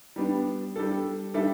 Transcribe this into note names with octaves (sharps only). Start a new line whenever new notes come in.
G3 B3 D4
G3 D4 A4
G3 D4 A4 E5